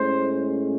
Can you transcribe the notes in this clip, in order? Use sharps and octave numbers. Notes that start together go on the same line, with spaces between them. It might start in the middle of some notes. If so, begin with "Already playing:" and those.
Already playing: A2 G#3 C#4 C5